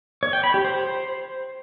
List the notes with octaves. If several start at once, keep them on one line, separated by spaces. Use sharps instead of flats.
C#5
G5
B5
G4
C5